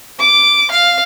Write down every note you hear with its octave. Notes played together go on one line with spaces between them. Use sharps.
D6
F5